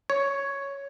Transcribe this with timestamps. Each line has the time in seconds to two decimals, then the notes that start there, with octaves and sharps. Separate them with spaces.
0.10 C#5